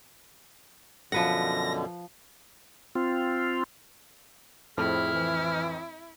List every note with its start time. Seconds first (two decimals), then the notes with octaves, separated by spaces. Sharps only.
1.12 F#2 B2 D3 F3 B4 F#5 A#6
2.95 C4 F4
4.78 F2 A2 C4 E4 G#4 F6
5.14 E3